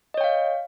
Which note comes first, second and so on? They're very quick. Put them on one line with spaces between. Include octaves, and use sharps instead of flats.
D#5 C#5 G5 F5